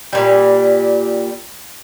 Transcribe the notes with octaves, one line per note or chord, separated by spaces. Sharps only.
A#2 G3